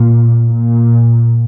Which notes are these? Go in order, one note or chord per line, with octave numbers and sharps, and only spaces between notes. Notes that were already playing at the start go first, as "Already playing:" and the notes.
Already playing: A#2
A#2